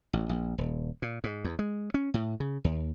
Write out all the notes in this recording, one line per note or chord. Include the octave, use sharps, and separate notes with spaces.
A1
A#1
D#1
A#2
G#2
E2
G#3
C#4
A2
C#3
D#2